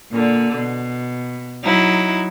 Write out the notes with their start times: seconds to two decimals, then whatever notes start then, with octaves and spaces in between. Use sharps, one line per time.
0.12 A#2 D3
0.56 B2
1.63 F#3 D#4 E4